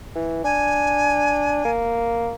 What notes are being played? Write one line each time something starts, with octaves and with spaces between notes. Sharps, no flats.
E3
D4 G#5
A#3